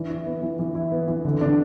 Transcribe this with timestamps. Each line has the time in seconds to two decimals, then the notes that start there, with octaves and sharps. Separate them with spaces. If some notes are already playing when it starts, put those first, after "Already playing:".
Already playing: E3 D4
0.09 E4
0.26 B3
0.42 E3
0.59 E3
0.75 E4
0.92 B3
1.08 E3
1.25 D3
1.41 D4